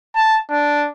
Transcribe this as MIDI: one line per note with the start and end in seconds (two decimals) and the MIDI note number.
0.15 0.38 81
0.50 0.87 62